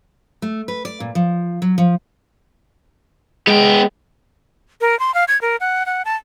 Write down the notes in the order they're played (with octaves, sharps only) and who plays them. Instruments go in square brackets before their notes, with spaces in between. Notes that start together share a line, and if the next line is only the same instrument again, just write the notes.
[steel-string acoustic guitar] A3
B4
D5
A#2
F3
F#3
F3
[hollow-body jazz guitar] G#3 [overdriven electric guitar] B3 G5
[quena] A#4
C6
F5
G#6
A#4
F#5
F#5
A5